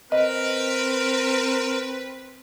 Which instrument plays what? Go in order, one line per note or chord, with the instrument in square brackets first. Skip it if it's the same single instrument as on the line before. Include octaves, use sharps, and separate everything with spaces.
[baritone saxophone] C4 [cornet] A#4 [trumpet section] B4 [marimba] D#5